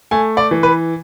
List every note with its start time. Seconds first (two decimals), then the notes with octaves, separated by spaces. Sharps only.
0.11 A3 G#5
0.37 D5
0.51 E3
0.63 B4